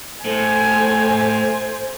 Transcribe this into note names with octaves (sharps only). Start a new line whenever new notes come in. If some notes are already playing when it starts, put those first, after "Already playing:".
A2 A4 C5 G#5